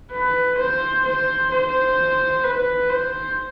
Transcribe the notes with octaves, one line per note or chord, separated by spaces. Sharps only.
B4
C5
C5
C5
B4
C5